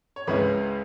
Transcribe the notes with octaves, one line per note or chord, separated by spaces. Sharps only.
C#5
C#2 C#3 G#3 C#4 E4 B4